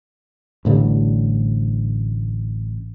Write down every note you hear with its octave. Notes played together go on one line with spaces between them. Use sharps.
A1 A2 D3 G3